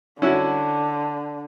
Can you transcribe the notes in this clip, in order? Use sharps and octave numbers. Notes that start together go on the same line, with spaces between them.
D3 C#4 E4 F#4